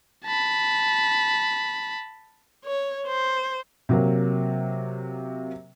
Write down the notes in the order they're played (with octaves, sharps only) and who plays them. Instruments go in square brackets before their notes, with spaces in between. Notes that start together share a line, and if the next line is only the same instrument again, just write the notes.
[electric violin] A5 B5
[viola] C#5
C5
[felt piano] C3 F#3 A#3